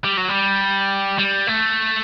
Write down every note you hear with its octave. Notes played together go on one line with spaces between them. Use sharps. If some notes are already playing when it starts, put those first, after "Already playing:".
G3
F#3
G3
G3
A3